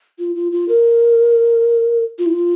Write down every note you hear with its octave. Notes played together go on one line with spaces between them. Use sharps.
F4
F4
F4
A#4
F4
E4
F4